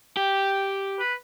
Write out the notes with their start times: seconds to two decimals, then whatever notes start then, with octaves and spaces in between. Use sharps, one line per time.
0.17 G4 G5
0.99 B4